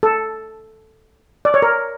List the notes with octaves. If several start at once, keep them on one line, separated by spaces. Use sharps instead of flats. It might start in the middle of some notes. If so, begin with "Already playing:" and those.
A4
D5
C#5
A#4